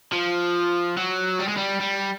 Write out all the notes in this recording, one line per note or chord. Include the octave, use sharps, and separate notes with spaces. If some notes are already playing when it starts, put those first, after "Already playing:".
F3
F#3
G3
G#3
G3
G3